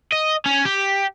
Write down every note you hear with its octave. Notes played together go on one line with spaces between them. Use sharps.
D#5
C#4
G4